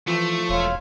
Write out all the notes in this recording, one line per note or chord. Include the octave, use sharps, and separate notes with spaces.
E3 F3 A3
E1 C#5 F5 C6